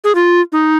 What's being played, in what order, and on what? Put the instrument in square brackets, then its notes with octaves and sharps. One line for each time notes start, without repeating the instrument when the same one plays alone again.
[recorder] G#4
F4
D#4